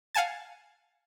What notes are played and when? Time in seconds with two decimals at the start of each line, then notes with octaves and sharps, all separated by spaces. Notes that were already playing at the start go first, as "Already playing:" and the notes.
0.14 F5 F#5 G#5 A5 A6